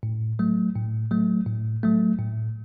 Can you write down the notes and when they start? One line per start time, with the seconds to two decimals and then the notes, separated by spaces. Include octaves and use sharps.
0.03 A2
0.39 F#3 A3
0.75 A2
1.11 F#3 A3
1.46 A2
1.83 F#3 A3
2.19 A2